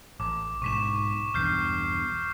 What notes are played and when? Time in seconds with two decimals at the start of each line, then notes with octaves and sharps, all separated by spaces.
0.20 A1 D6
0.62 B1 G#2 C#6 B6 E7
1.34 B1 E2 G2 F6 G6 C7